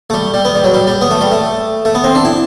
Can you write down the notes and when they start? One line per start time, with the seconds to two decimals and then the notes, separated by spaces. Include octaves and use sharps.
0.10 A3
0.14 G3
0.34 G3
0.45 B3
0.55 G3
0.64 F#3
0.74 G3
0.87 G3
1.01 B3
1.11 A3
1.21 G3
1.32 A3
1.85 A3
1.95 B3
2.04 C4
2.15 D4
2.25 E4